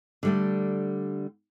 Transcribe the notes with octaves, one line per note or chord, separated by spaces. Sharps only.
D3 G3 A3